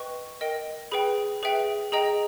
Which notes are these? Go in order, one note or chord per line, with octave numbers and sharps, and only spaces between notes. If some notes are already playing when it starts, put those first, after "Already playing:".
Already playing: B4 D#5 G5 C#6
A#4 D#5 G5
G#4 B4 G5 B5
G#4 B4 E5 G5
G#4 D#5 G5 A#5